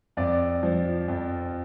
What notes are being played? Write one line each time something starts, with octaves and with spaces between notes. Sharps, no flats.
F2 D5
F3
F2